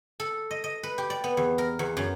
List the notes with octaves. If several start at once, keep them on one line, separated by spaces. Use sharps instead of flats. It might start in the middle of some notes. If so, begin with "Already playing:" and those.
A4
D#5
D#5
B4
G4
D5
B3
E2
A#4
E2
F#2